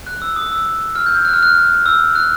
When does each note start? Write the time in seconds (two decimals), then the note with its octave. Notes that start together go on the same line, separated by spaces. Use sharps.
0.07 F#6
0.22 E6
0.36 D#6
0.52 E6
0.96 F6
1.06 G6
1.17 G6
1.25 F#6
1.33 F6
1.43 F#6
1.86 E6
2.15 F#6